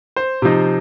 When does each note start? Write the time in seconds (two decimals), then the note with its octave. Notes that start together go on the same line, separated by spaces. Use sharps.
0.16 C5
0.42 C3 F3 D#4